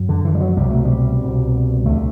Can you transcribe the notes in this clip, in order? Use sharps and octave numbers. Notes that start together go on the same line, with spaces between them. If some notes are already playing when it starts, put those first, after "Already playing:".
Already playing: F#2
D3
E3
G3
F#3
C2 B2 G3
A3
G3
C2 B2
D2 D3 A3